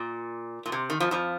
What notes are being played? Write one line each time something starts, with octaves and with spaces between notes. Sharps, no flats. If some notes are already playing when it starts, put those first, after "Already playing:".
Already playing: A#2
A#2
C3
D#3
F2 F3
F2 F3